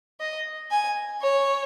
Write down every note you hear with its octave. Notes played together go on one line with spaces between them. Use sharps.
D#5
G#5
C#5